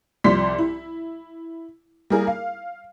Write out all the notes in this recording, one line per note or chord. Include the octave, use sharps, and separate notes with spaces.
C2 F3 G3 D5 C6 B6
E4
G3 A#3 E4 G#4 A#4
F5